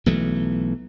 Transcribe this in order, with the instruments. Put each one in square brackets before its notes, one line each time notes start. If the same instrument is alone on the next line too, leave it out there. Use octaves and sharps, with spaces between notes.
[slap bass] B1 E3 A3